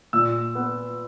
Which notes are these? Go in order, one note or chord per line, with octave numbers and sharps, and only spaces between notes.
A#2 E6
B3